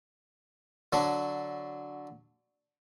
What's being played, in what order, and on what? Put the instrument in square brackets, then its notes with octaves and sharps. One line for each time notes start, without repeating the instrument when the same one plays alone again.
[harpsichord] D3 F#3 D4